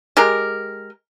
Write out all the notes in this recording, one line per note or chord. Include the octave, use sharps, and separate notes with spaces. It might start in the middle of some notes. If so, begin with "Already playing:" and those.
G#3 G4 A#4